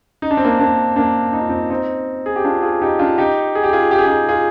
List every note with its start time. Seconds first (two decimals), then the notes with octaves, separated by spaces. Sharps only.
0.22 D#4
0.31 D4
0.37 C4
0.44 A#3 D4
0.59 A#3 D4
0.96 A#3 D4
1.33 D#4
1.41 F4
1.49 C4 D#4
1.70 C4 D#4
2.26 G#4
2.36 G4
2.44 D4 F4
2.62 F4 G#4
2.82 D#4 G4
2.99 D4 F4
3.18 D#4 G4
3.55 G#4
3.64 G4
3.73 F4 G#4
3.91 G4
3.98 G#4
4.06 D#4 G4
4.28 F4 G#4